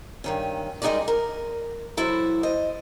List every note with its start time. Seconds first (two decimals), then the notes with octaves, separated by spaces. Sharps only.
0.24 G2 D#3 C#4
0.82 G3 G#3 D#4 G#4 A#4 D5
1.08 A#4
1.97 E3 F#3 E4 A4 C5
2.43 C5 D#5